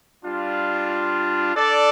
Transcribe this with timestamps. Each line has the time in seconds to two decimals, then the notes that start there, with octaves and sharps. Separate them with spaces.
0.24 G3 D4 F4
1.53 D4 A4 D5